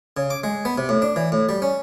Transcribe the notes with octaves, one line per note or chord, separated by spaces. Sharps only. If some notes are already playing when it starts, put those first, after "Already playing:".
C#3
D6
G#3
B3
C3
A2
D4
E3
A2
G3
C#4